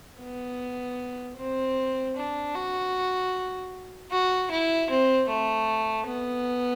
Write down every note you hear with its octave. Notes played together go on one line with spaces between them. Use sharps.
B3
C4
D4
F#4
F#4
E4
C4
A3
B3